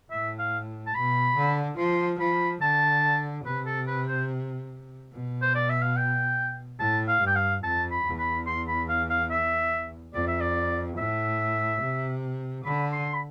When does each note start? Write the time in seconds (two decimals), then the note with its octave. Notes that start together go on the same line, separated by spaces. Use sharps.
0.11 A2 E5
0.39 F5
0.86 A5
0.94 B2 B5
1.36 D3
1.78 F3 C6
2.20 F3 B5
2.62 D3 A5
3.45 C3 B4
3.66 A4
3.87 B4
4.08 C5
5.13 B2
5.42 C5
5.55 D5
5.69 E5
5.82 F5
5.96 G5
6.79 A2 A5
7.08 F5
7.21 G2
7.27 G5
7.35 F5
7.63 F2 A5
7.91 B5
8.05 E2
8.19 B5
8.47 C6
8.68 B5
8.89 F5
9.10 F5
9.31 E5
10.14 F2 D5
10.28 E5
10.41 D5
10.97 A2 E5
11.82 C3
12.65 D3 B5
12.93 C6
13.14 B5